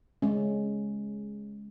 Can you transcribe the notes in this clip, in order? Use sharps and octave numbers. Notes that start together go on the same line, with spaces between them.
G#3 C#4